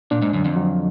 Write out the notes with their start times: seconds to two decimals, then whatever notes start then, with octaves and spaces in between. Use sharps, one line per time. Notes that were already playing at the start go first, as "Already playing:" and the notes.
0.11 A#2 D4
0.22 G#2
0.33 F#2 D3
0.45 F2
0.56 F#3